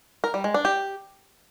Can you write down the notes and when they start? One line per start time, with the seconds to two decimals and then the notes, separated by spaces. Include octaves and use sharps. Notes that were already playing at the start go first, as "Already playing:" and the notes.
0.24 A#4
0.34 G3
0.44 G#3
0.54 D4
0.65 G4